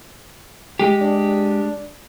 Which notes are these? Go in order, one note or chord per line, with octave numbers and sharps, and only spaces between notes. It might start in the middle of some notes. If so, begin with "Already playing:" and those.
G#3 G4
D4